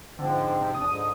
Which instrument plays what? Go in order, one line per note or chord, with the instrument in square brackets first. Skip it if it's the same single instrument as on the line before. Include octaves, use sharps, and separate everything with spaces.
[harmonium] G#2 F3 C4 [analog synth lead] D3
[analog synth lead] C3
[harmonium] E2 F3 D4 [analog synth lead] D#6
[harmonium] G#2 D3